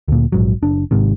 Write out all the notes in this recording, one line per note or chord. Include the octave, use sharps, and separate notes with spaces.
D2 A#2
A#1 G#2 F#3
F#1 D4
G#1 G#2 C3 D#3